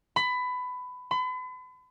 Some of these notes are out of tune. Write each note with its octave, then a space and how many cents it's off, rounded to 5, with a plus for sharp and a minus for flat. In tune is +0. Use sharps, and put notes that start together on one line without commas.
B5 +20
B5 +40